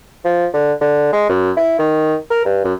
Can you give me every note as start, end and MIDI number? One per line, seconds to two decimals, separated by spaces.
0.25 0.47 53
0.54 0.73 50
0.81 1.12 50
1.12 1.26 56
1.29 1.51 42
1.57 1.75 64
1.79 2.15 51
2.30 2.43 70
2.45 2.60 43
2.64 2.73 42